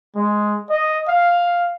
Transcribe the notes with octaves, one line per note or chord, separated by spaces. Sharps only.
G#3
D#5
F5